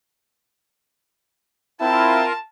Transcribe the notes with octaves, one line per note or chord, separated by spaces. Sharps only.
C4 E4 F4 A#4 A5